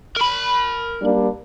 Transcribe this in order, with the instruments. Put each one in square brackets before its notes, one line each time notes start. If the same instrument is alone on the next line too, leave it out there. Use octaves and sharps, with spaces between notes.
[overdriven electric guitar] A#4 B5
[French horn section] G3 A#3 D4